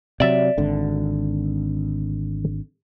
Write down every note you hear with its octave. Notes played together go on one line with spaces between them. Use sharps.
C3 F#3 D5 E5
G#1 D3